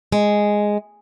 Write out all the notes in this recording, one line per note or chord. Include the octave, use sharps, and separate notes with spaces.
G#3